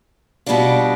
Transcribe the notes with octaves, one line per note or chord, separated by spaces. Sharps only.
B2 G3 B3 D4 F4